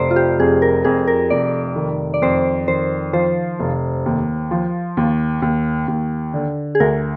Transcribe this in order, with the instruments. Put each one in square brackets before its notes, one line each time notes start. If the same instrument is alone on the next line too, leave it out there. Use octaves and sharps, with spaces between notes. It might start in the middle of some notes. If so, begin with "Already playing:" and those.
Already playing: [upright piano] F1 [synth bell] C5 D5
[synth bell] F4
G4
[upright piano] F2 [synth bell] G#4
[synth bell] A#4
[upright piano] F2 [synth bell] G#4
[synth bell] A#4
[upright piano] F1 [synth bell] D5
[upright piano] D#3
[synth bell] D5
[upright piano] F2 [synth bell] C5
[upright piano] D#3 [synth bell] C5
[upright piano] F3 [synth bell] C5
[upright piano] F1
D#2
F3
D#2
D#2
D#2
D3
[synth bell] G#4
[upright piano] D2 [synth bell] A#4